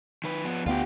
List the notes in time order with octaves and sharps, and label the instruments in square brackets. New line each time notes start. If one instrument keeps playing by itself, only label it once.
[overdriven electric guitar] D#3 B4
F3 B3
[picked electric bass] D2 B3 [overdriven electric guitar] F4 G4